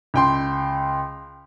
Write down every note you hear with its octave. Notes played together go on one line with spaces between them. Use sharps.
C#2 G5 C6